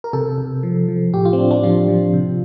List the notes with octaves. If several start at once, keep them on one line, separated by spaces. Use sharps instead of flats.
A#4
C3 A4
C3
F3
F3
A2 G4
F4
C4
A2 D4
D4
F3 F4
F3
C3